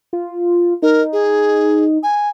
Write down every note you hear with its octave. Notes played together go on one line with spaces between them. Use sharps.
F4
D#4 A#4
G#4
G#5